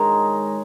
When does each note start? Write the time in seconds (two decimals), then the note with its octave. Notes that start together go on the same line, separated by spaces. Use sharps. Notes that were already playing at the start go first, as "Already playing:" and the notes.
Already playing: D#3 G#3 D#4 G#4 A#4 C#5